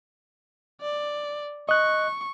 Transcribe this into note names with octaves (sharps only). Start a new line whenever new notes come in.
D5
D#5 C#6 F#6